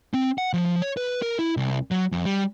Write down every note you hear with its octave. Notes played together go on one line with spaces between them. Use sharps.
C4
F#5
F3
C#5
B4
A#4
E4
C2
F#3
F2
G3